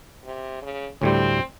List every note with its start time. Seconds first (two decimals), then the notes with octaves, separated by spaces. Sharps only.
0.25 C3
0.62 C#3
1.02 D2 A2 G3 C4